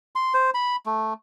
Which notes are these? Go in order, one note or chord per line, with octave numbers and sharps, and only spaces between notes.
C6
C5
B5
A3